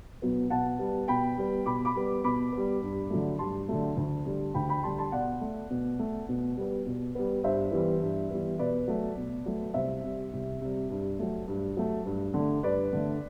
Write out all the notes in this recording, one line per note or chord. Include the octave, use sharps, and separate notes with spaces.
B2 F#3 B3
B2 F#5 A5
G3 B3
B2 G5 B5
G3 B3
B2 B5 D6
B5 D6
G3 B3
B2 B5 D6
G3 B3
G2
D3 F#3 A3
G2 A5 C6
D3 F#3 A3
D2
D3 G3
D2 G5 B5
G5 B5
D3 G3 A5 C6
A5 C6
B2 D5 F#5
A3
B2
A3
B2
G3 B3
B2
G3 B3
G2 C5 E5
E3 G3 B3
G2
E3 G3 B3
B2 B4 D5
F#3 A3
B2
F#3 A3
C2 C5 E5
C3 G3
C2
C3 G3
G2
F#3 A3
G2
F#3 A3
G2
D3
A3
G2 B4 D5
D3 A3